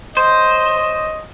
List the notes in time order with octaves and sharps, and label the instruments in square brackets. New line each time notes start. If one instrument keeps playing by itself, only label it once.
[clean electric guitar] C5 [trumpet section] C#5 D#5